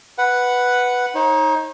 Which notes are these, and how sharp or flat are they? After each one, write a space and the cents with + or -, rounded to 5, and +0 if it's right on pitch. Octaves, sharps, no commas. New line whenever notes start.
B4 +0 F#5 +0
D#4 +20 C#5 -40